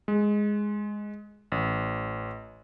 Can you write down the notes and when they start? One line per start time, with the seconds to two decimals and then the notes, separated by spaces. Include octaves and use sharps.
0.08 G#3
1.52 A1